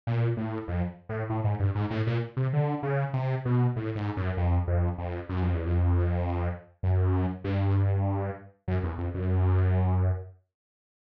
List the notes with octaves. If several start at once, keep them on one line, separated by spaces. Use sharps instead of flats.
A#2
A2
F2
A2
A2
G#2
G2
G#2
A2
A#2
C3
D3
C#3
C3
B2
A2
G#2
F#2
F2
F2
F2
F#2
F2
E2
F2
F#2
G2
F#2
E2
F2
F#2